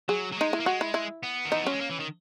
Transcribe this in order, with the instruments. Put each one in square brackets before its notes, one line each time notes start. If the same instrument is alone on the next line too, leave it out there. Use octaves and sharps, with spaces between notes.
[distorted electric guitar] F#3 [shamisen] G#4
[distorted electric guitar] F#3
[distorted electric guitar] G#3 [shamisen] D#4
[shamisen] E4
[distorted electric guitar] A#3
[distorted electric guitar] G#3 [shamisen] F#4
[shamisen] E4
E4
[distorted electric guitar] B3
D#3
[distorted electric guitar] E3 [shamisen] D#4
[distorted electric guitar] F#3 [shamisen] C#4
[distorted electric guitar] G#3
A#3
E3
D#3